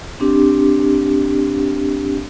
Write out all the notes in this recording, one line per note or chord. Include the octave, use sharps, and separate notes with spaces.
C4 D4 G4